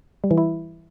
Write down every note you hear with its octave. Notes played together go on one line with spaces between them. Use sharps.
G3
E3
E4